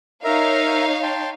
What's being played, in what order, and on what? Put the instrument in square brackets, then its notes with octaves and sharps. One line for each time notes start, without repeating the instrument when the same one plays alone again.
[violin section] D#4 C#5 F5 [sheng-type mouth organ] A#4 E5 A#5
[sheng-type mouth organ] G5 A5 C6